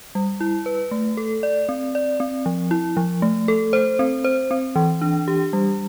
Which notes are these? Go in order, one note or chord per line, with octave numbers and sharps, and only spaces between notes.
G3
E4
B4
A3
A4
D5
C4
D5
C4
F3
E4
F3
A3
A4
C5
C4
C5
C4
E3
D4
G4
G3